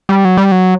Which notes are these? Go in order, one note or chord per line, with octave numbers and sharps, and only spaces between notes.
G3
F#3
G3
F#3